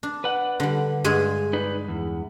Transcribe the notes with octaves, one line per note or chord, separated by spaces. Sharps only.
D4
B4 D5 F#5
D3 G3
G2 G#3 G#4
D#4 B4 D5
E2